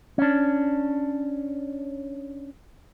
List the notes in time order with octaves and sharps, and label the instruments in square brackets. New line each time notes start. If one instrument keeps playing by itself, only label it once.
[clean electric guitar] C#4 D4